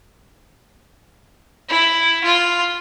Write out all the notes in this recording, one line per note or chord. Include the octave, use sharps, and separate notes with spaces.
E4
F4